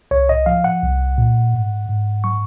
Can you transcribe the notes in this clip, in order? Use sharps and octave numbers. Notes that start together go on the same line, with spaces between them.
C2 C#5
D#5
F3 F5
F#5
C2
A#2
G#2
G#2
F#3 C#6